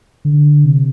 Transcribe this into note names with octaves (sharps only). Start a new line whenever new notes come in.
D3
C3